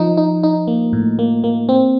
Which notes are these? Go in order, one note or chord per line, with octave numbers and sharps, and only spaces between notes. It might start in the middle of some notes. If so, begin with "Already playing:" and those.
Already playing: F3 D#4
D#4
D#4
A#3
A2
A#3
A#3
C4